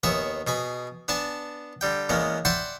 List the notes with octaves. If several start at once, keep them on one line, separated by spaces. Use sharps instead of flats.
D#2 B3 G#4 C#5 E5
B2 G#4 G#5 B5
B3 D4 G#5 A5
D3 G3 G5
E2 G#3 A#3 B3 C#4
D5 E5 F#5 G5 B5 C6